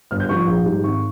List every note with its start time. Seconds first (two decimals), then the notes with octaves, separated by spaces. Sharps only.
0.11 G1 F6
0.20 G6
0.29 G2 F3 C#6
0.47 A#1
0.66 G#2 G3
0.84 G#1 C#6